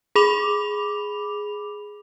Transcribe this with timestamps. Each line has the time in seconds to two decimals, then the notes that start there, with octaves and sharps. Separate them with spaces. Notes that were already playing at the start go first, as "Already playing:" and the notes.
0.15 G#4 B5 D6 F7